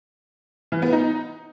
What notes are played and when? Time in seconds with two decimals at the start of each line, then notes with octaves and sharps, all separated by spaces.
0.72 E3
0.82 B3
0.92 D#4